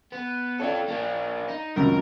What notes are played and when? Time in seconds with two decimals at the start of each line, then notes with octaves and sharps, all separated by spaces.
0.12 B3
0.60 F4 A4 C#5 D5 G5
0.88 A#3 D4
1.48 D#4
1.76 G#1 C#2 F#2 A#4